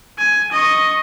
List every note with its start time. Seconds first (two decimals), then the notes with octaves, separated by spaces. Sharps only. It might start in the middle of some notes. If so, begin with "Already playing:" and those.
0.19 G#5
0.52 D#5 C#6